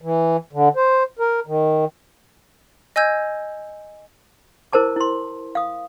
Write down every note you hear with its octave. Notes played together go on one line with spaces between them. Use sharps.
E3
D3
C5
A#4
D#3
D#5 G#5 E6 G6 G#6
E4 A#4 C5 A5 D6
E4 C6
F5 D#6